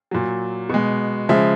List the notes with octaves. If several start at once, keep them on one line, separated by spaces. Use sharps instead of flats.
A#2 F#3
B2 G#3
C#3 F3 G#3 E5